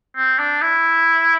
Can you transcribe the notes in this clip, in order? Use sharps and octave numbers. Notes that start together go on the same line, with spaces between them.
C4
D4
E4